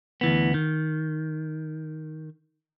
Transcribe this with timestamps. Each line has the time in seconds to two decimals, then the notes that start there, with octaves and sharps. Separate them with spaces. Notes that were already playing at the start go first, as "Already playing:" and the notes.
0.21 D2 E3 B3
0.54 D#3